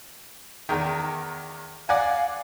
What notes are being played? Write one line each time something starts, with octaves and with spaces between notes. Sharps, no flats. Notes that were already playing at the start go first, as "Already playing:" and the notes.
E2 D#3
D5 F5 F#5 G#5